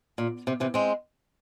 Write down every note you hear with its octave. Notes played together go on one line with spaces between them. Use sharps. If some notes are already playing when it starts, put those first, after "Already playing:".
A#2
C3
C3 E3
G#3 C4